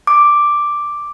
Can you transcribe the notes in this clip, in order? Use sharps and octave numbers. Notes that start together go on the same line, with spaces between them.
D6